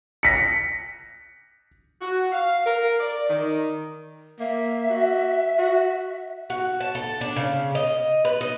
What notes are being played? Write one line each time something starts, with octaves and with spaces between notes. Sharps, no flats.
A#6 B6 C#7
F#4
F5
A#4
D5
D#3
A#3 E5
F#4
F#4
F#4
A5
A4
D4
C#3
D#5
B4
D#5